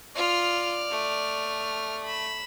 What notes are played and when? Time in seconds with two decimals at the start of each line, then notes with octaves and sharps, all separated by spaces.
0.16 F4 D5 F6
0.91 A3
2.05 B5 E7